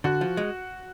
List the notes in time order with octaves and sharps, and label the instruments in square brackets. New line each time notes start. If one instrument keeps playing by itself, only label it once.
[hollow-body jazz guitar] D3 [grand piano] F#4
[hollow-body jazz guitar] F3
G#3